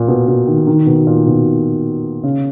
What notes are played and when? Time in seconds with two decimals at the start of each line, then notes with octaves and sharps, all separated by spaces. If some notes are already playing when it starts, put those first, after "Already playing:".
Already playing: A#2
0.08 B2
0.28 B2
0.47 D#3
0.67 D#3
0.86 B2
1.07 A#2
1.26 B2
2.23 C#3